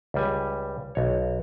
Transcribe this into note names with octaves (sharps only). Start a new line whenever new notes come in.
C#2 G3 G#5
B1 C#5